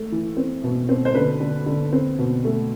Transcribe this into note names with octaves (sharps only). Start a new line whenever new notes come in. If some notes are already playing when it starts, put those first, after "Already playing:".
Already playing: A3
E3
C4
B2
C4
C5
D3 B4
D3
D3
C4
B2
A3